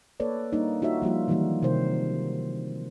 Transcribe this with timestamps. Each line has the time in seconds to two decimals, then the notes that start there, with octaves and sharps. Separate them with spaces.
0.20 A#3 A4 B4 C#5 D5
0.53 G3 A#3 D4 D#4
0.82 D#4 F4 F#4 C#5 E5
1.02 F3 G3 A#3 F4
1.28 D#3 E3 F#3 G3 A#3 D#4
1.63 C3 D#3 D#4 A#4 C5